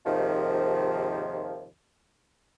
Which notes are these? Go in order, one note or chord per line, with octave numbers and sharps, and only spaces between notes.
D#2 G#2 C3 D#3 F3